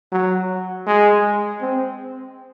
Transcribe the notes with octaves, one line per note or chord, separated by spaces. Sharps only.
F#3
G#3
C4